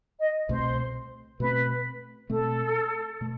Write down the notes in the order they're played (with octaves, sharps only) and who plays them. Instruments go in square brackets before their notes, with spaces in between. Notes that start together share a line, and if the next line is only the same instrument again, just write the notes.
[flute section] D#5
[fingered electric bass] C2 B2 A3 C4 [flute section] C5
[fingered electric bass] B2 A3 C4 [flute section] B4
[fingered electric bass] B2 A3 C4 [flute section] A4
[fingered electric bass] B2 A3